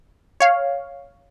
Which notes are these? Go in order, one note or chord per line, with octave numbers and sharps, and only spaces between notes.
C#5 F5